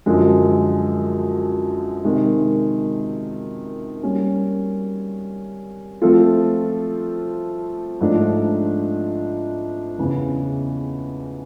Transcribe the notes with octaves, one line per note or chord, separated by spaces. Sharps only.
F#2 D3 F3 G#3
C3 D#3 G#3
G3 A#3 C#4
F3 A3 C4 F4 A4
G#2 F3 A3 D4
E2 C#3 E3